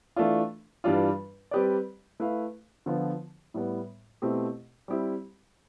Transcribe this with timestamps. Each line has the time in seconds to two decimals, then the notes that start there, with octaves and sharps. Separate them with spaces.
0.16 E3 A3 D4 F4
0.84 G2 E3 G3 D4 F4
1.51 G3 C4 G4 B4 D5
2.20 A3 E4 B4 F5
2.86 D3 F3 B3 F4
3.54 A2 G3 B3
4.22 B2 A3 C4 E4 G4
4.88 G3 C4 E4 G4